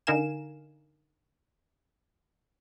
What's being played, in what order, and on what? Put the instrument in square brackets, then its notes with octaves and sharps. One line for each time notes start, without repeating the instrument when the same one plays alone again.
[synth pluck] D3 D#4 A#4 F5 G#5 E7